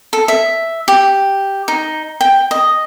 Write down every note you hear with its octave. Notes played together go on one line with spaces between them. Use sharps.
A4
E5
G4
D#4
G5
D#5